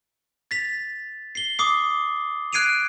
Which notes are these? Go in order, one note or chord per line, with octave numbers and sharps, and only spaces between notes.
A6 B6 F7
C7 G7
D6 D#6 C7
F#6 G#6 C7 D7 D#7 F7